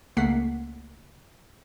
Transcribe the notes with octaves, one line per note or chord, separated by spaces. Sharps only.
C#2 A3 A#3 F#5 B6 C7